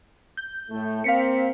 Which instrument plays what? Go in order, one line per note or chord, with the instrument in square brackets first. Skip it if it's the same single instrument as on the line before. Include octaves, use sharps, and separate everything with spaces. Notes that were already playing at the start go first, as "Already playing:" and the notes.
[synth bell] G6
[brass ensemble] A2 A3
[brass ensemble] A#3 C4 [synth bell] F5 B6 C#7